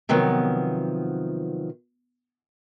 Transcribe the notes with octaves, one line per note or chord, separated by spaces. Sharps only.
C3 D#3 F3 F#3 B3